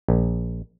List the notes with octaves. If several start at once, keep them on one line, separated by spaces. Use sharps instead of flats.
A#1